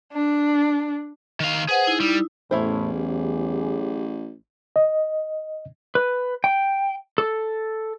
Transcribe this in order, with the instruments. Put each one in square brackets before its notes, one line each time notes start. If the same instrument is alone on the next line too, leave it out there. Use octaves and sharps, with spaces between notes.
[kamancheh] D4
[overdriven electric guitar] D#3 F5
[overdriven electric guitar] G#4 [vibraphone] B4 C5 F#5
[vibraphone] D#4 E4
[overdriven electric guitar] G3
[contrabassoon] A1 [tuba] E2 [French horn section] A2 [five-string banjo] C#4 E4 C5
[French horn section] F#3 G4 G#4
[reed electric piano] D#5
[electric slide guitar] B4
G5
A4